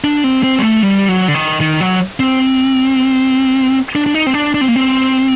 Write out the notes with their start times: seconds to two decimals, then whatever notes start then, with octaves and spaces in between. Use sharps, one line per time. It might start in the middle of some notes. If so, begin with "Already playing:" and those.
0.04 D4
0.24 C4
0.43 C4
0.59 G3
0.62 A3
0.83 G3
1.09 F#3
1.28 D3
1.34 D#3
1.61 D#3
1.81 F#3
2.20 C4
3.95 D4
4.06 D4
4.14 D#4
4.26 C4
4.34 D4
4.54 D4
4.61 C4
4.68 A#3
4.76 C4